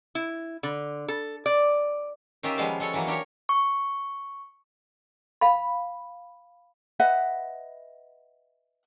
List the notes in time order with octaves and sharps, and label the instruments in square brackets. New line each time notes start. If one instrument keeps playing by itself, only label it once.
[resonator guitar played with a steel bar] E4
D3
A4
D5
[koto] D#3 C#4 F4 G4 A#4 E5
F3 G3 G#3 B3 F5
G#3 A4 C#5
E3 F#3 A#3
D4 G4 A#4 C#5
[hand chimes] C#6
[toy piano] F5 B5
[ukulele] B4 D#5 E5 F#5